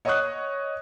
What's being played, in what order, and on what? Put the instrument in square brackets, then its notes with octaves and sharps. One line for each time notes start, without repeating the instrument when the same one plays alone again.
[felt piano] C#5 D#5 F#5 C#6 D#6 F#6